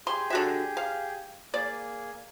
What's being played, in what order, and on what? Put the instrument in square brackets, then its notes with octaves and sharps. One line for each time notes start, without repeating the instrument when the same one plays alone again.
[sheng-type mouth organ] G4 G#4 [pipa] C6
[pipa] D3 F#4 E5
F5
[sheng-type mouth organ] A#3 G#4 [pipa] D5